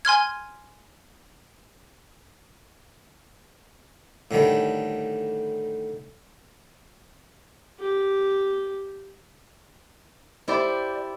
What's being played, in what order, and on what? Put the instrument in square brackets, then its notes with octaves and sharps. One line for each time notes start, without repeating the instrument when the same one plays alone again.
[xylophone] G#5 C6 F6 G#6
[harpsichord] A2 D3 D#3 G3
[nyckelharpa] G4
[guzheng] E4 G4 C5 D5